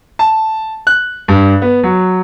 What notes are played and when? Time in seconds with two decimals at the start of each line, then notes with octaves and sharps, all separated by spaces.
0.19 A5
0.87 F#6
1.28 G2
1.62 B3
1.83 F#3